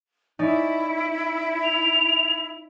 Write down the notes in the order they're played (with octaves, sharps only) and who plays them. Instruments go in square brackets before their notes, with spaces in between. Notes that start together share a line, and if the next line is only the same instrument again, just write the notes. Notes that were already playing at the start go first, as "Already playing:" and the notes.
[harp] C#4 D#4 D5 [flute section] E4
[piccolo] F7